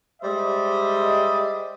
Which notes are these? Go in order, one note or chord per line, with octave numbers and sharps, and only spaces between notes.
G3 G#3 C5 D#5 E5